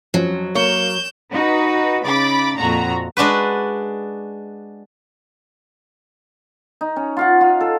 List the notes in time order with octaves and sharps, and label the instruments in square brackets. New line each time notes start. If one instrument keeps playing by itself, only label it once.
[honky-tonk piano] F2 F3 C#4 [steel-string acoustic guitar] F#3
[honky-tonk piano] A#3 A#4 [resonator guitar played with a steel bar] C#5 [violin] G6 E7
[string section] D#4 F#4 B4
C#3 D#4 B5 D6 A6
F2 A#2 F#4 A#5
[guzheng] G#3 D4 F#4 B4
[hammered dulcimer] D#4
C#4
F4 F5 F#5
F4
A4